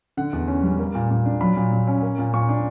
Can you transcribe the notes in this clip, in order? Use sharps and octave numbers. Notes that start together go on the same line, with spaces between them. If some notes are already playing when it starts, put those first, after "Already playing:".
D3 F#5
E2
C#4
G3
A#3
A#2
A#2
D4
F#3 B5
A#2
A#2
C#4
A#3
A#2
A#2 C#6
D4